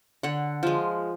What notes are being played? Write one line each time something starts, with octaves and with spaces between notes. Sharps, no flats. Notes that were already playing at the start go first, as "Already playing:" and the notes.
D3 F#5
F3 G#3